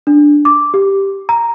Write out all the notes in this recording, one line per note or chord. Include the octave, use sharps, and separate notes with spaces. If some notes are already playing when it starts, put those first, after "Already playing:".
D4
D6
G4
A#5